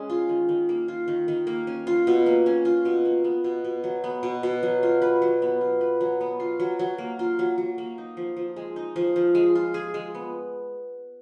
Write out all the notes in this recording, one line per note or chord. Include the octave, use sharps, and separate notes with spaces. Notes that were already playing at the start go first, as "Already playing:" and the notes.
Already playing: G#3 C#4
F4
D#3
D#3
A#3
F4
D#3
D#3
A#3
C#4
F4
B2
A#3
C#4
F4
B2
A#3
B3
B2
B2
F#3
B3
B2
B2
F#3
F4
B4
F#3
B3
F4
B4
F#3
B3
F4
F#3
F#3
A#3
F4
F#3
F#3
A#3
D#4
F3
F3
G#3
D#4
F3
F3
G#3
F4
G#4
G#3
B3